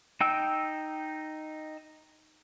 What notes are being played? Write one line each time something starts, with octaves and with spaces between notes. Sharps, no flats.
D#4 G5 E6